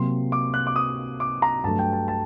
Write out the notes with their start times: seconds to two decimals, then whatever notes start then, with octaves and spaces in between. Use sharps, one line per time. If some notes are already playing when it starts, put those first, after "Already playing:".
Already playing: C3 F#3 A#3 C6
0.32 D6
0.54 F#6
0.67 D6
0.76 D#6
1.20 D6
1.42 A#5
1.64 G2 F#3 A3 A5
1.79 G5
1.93 A5
2.08 A5